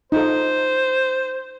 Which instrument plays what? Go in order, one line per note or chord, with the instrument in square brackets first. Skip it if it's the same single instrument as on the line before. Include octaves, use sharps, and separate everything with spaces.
[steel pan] D#4 F4 A4 [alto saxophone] C5